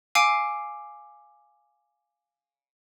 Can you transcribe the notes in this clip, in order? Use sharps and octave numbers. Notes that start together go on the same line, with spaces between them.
F5 G#5 D6 E6 C7 D7